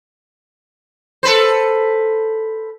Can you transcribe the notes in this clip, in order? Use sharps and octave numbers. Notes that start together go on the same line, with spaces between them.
A4 B4 C5